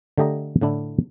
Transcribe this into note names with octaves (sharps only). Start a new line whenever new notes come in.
D3 A3 G4 D#5 A#5
A2 D3 D4 E4